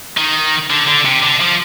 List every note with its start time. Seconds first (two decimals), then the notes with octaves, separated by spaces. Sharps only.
0.17 D#3
0.70 D3
0.87 D3
1.05 C3
1.23 D3
1.41 F3